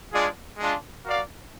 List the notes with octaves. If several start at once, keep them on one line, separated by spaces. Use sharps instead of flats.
G#3 D4 F4 G#4 D5
G#3 D4 F4
F#4 A#4 D5 F5